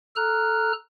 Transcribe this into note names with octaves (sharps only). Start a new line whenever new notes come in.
A4 A#5 F6 F#6